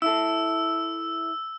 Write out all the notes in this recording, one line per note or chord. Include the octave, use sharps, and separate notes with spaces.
E4 A4 E6